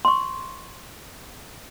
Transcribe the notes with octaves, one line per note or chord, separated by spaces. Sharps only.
C6 C#6